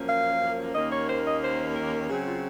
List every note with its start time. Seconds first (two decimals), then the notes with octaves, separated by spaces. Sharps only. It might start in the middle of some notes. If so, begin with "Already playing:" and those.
Already playing: F#2 F3 A#3 C#4
0.08 F5
0.75 D#2 D#3 A#3 C#4 D#5
0.92 C#5
1.08 C5
1.26 D#5
1.42 C5
1.75 A#4
2.09 C#3 F#3 C4 G#4
2.26 F4